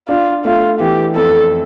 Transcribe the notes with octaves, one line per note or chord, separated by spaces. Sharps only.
D4 F4
A3 F4
E3 G4
F2 A4